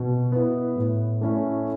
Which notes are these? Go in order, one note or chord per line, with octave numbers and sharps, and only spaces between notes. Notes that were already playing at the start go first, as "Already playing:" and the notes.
Already playing: B2
B3 E4
A2
A3 C#4 E4